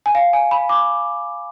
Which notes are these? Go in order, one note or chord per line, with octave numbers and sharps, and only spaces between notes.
G#5
F5
G#5
B5
D6